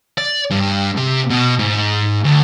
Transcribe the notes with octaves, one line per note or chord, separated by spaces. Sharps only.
D5
G2
C3
B2
G#2
D2